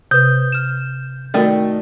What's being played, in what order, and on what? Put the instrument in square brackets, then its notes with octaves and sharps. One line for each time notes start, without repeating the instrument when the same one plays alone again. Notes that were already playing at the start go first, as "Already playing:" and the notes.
[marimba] C3 [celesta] B4 D#6 [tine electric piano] G6
[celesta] F6 E7
[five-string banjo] D#3 A3 [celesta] F#4 A#4 D5